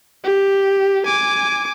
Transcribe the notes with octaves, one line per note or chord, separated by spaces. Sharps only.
G4
G#5 D6